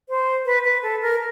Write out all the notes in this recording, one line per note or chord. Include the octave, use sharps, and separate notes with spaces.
C5
B4
B4
A4
A#4